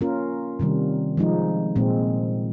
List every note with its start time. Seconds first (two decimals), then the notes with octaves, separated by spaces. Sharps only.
0.01 A#3 C#4 F4 A#4
0.59 C3 D#3 G3
1.17 F3 G#3 D#4
1.76 A#2 G#3 C4